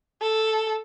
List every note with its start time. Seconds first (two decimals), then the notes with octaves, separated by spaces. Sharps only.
0.22 A4